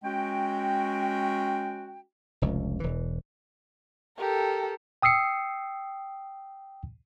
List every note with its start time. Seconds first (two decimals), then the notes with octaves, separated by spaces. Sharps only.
0.04 G#3 C#4 F#4 G5
2.42 F1 C#2
2.80 E1 E3
4.18 G4 A4 A#4
5.02 G5 D#6 E6 C7 C#7